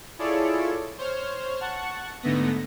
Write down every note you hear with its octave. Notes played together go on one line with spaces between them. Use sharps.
E4 F4 G#4 A4 C#5 D5
C5 C#5 F6
F#5 A5 C#6
G#2 D3 A3 B3 A#6